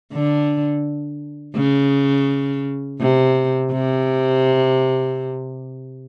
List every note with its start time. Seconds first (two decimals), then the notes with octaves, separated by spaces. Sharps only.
0.13 D3
1.56 C#3
3.00 C3
3.72 C3